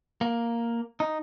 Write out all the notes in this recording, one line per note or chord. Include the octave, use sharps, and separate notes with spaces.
A#3
D#4